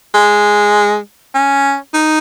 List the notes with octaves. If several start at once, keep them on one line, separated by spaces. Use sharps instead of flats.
G#3
C#4
D#4